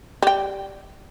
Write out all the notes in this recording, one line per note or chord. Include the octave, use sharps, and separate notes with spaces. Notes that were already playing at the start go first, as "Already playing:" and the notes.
G3 G5